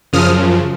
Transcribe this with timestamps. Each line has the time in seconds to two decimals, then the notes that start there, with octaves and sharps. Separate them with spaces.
0.13 F#2 C#3 F3 D#6 F6